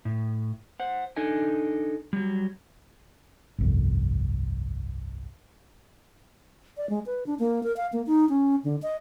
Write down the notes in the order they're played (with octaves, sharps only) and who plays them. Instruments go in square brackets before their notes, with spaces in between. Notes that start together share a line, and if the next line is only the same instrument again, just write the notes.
[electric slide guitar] A2
C5 F#5
D4 D#4 A4 D#5 G#5
F#3 G3
[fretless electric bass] G1 C2 F2
[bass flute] D5
G#3
B4
D4
A#3
A#4
F5
A#3
D#4
C#4
D3
D#5